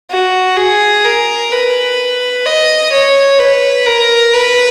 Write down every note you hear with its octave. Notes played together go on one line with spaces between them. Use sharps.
F#4
G#4
A#4
B4
D#5
C#5
B4
A#4
B4